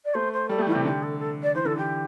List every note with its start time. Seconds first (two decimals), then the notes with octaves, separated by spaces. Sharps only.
0.04 D5
0.14 A3 C5
0.32 C5
0.49 G3 A4
0.58 A3
0.61 G4
0.67 E3 E4
0.72 C3 G4
0.85 D3 G4
1.02 A4
1.19 A4
1.42 D5
1.55 E3 C5
1.65 D3 A4
1.77 E3 G4